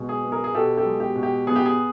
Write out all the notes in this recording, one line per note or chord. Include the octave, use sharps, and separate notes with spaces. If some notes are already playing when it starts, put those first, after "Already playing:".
Already playing: B2 G#3
G#4
B3
G#4 A#4
G#4
B2 G4 A4
G4 A4
G#3
G4
B2
G4
B3 G#4
G4
G#4